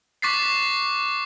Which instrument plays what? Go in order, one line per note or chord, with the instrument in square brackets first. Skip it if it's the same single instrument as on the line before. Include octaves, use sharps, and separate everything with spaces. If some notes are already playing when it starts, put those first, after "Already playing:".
[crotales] C#6 D6 F#6 A6 B6 C7